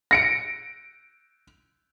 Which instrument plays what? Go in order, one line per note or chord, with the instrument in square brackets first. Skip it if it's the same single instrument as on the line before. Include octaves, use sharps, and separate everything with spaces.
[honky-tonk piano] A#6 C#7 D7